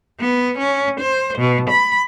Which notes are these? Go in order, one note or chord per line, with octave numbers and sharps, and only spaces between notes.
B3
C#4
C5
B2
B5